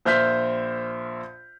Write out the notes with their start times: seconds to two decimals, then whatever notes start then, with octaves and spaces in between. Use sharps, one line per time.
0.05 A#1 C5 E5 F6 G6 B6